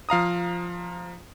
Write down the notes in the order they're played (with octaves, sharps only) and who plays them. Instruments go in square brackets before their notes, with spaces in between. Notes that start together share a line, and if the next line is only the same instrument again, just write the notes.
[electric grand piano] F3 F5 A#5 D#6